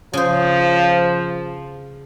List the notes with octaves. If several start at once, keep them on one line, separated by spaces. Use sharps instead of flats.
C#3 F3 C5